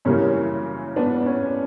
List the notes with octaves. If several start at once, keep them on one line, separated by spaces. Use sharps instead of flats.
F#2 C#3 E3 G3 A#3 C#4
B3 D4
C#4